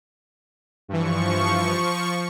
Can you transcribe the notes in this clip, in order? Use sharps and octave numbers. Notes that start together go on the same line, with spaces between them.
G2 E3 F3 C#6